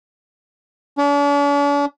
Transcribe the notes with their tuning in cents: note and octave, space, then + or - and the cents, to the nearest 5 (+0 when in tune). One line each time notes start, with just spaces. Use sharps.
D4 -45